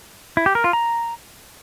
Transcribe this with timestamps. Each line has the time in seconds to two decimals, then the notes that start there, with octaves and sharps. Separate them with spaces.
0.37 E4
0.46 G4
0.55 A#4
0.64 F4
0.73 A#5